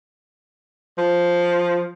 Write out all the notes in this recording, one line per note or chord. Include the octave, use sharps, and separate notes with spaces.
F3